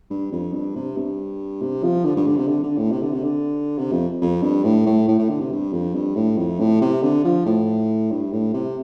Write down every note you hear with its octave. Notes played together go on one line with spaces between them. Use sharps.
G2
F2
G2
C3
G2
C3
F3
D3
G2
D3
C3
D3
D3
A2
C3
D3
C3
D3
C3
F2
F2
G2
A2
A2
A2
A2
D3
C3
G2
F2
G2
A2
F2
A2
C3
D3
F3
A2
G2
A2
C3